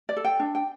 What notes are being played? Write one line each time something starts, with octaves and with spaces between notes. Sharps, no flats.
D5
A4
G5
D4
G5